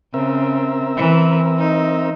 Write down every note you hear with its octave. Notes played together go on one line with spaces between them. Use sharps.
C#3 C4 A#4 E5
E3
D#4